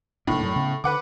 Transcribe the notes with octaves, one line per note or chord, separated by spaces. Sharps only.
F1 A2 A#3 D4
F#2 F#3 G3
C#3 B3
D3 B4 F#5 D6